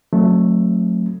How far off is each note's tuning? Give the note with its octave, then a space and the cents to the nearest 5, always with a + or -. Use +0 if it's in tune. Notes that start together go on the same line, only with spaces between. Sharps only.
F#3 -25 A3 +0 C4 +40